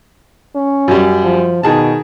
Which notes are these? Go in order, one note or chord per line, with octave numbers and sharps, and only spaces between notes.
C#4
F#2 G3
F3
B2 D#3 G#4 A5